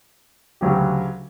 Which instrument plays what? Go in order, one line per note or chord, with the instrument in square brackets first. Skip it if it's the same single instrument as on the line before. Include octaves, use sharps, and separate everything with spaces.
[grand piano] D2 C#3 F#3 C#4 G4